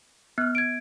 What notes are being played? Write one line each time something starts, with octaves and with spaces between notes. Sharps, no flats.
B3 F6 F#6
G#6 D7